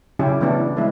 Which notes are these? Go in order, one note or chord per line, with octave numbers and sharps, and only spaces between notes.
C#3 F#3 C#4 E4 G4 G#4
E3 F#3 A3 B3 D4
E3 G#3 B3 E4